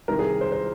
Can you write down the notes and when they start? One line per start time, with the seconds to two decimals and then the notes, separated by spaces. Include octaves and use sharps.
0.08 C2 C3 D#3 A#4
0.19 G#4
0.41 C5
0.52 C5